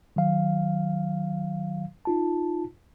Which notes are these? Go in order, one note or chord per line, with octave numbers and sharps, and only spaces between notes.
D#3 F#3 F5
D#4 F4 A5